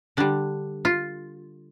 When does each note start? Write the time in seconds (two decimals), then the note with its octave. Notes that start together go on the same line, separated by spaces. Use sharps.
0.17 D3 G3 D4
0.85 F4